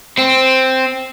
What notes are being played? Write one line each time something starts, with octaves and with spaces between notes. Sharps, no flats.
C4